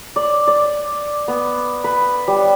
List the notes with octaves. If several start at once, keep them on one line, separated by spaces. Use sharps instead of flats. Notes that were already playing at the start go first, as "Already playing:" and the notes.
D5
D5
B3
B4
G3